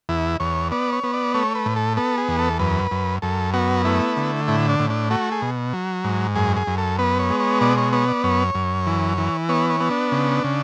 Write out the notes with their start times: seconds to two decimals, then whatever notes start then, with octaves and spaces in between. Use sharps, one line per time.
0.09 E2 E4
0.40 E2 C#5
0.72 B3 D5
0.93 C#5
1.04 B3
1.14 D5
1.34 A3 C#5
1.55 B4
1.66 A2
1.76 A4
1.97 B3 A4
2.18 G#4
2.28 E2
2.39 A4
2.59 F#2 B4
2.91 F#2
3.22 F#2 A4
3.53 B3 F#4
3.85 A3 E4
4.17 D3
4.48 A2 E4
4.69 D4
4.80 A2
4.90 D4
5.11 A3 F#4
5.32 G#4
5.42 B2
5.73 F#3
6.04 G#2
6.35 F#2 G#4
6.57 G#4
6.67 F#2
6.78 A4
6.99 B3 B4
7.19 C#5
7.30 G#3
7.40 C#5
7.61 B2 D5
7.77 C#5
7.93 B3 C#5
8.08 D5
8.24 F#2 C#5
8.55 F#2
8.87 E3
9.17 E3
9.49 B3 C#5
9.70 C#5
9.80 B3
9.91 D4
10.12 C#3
10.44 C#3